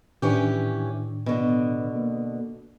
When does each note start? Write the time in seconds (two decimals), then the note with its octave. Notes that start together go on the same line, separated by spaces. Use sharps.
0.22 A2 D#3 E3 C#4 D4 G4
1.26 B2 D3
1.96 A#3